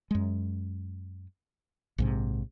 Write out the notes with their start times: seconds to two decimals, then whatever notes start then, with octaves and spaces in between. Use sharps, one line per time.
0.11 F#2 G#3
1.98 A#1 G#2 C3